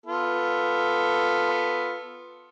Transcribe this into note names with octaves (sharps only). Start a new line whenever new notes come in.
B3 F4 A4